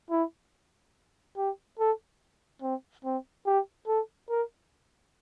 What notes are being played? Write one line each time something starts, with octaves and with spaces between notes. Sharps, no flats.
E4
G4
A4
C4
C4
G4
A4
A#4